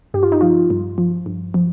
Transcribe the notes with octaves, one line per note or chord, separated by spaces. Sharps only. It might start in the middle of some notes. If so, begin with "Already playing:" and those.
G2 G4
F4
D#4
F3 F4
G2
F3
G2
F3